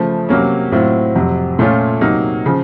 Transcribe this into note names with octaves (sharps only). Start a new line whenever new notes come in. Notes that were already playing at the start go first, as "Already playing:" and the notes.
Already playing: C#3 F3 A3
C3 F#3 A#3 C#4
A2 F#3 C4 F4
F2 C3 F#3
A#2 A3 C#4 F4
C3 F#3 A#3 D#4
C#3 F3